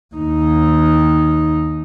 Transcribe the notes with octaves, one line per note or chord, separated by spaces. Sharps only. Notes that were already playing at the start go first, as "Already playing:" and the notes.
D#2 D#4